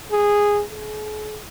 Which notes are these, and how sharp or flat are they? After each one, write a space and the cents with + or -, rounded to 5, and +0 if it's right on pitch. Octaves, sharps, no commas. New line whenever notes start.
G#4 -10
G#4 +45